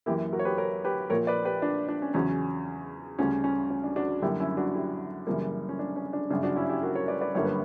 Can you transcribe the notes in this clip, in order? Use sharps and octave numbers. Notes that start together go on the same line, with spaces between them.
F#2 E3 A#3 E4 G4
F#4 A#4
C#5
G4 B4
A#4 C#5
G4 B4
A#1 A#2 A#3 A#4 C#5
B4 D5
G4 B4
D4
D4
C#4
E2 C#3 F#3 C#4
D2 C#3 G3 C#4
C#4
C#4
D4
D4 F#4
F#2 D3 G3 A#3 E4 G4
C#4 E4
D4 F#4
E4 G4
F#2 C#3 E3 G3 A#3
C#4
D4
C#4
D4
G1 F#2 C#3 D4
D4 F#4
C#4 E4
E4 G4
F#4 A#4
A#4 C#5
B4 D5
B4 D5
G1 F#2 D3 G3 A#3 C#5
B4